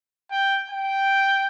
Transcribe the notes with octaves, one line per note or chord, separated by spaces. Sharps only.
G5
G5